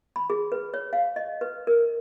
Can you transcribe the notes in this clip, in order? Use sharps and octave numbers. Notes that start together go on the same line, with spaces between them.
B5
G#4
B4
C#5
F5
D#5
B4
A#4